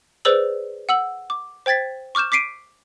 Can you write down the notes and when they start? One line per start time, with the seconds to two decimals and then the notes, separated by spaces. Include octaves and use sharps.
0.25 G#4 B4 C5 D5 E6 F#7
0.89 F#5 E6 F#7
1.30 D6
1.66 C5 G5 G#6 A6 B6
2.15 C#6 D6 F6 G6 E7
2.32 D6 B6 C7 D7 D#7